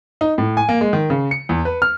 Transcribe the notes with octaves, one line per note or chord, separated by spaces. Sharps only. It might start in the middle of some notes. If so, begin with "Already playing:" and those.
D#4
A2
G#5
A#3
G#3
D#3
C#3
C#7
E2
B4
F6